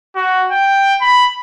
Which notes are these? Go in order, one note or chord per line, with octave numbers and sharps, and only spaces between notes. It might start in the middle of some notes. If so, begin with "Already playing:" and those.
F#4
G5
B5